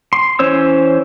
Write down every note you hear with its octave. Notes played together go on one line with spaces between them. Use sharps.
C6
E3 C#4 C5 C#5 E6